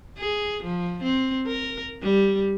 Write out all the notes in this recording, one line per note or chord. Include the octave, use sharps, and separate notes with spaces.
G#4
F3
C4
A#4
G3